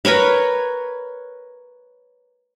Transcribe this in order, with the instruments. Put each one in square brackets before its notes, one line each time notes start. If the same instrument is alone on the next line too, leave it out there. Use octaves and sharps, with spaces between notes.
[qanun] A#4 B4 C#5 B5